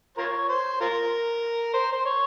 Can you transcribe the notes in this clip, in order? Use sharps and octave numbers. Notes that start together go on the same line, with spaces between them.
F4 A#4 C#5
C5
F4 A#4
C5
C5
C#5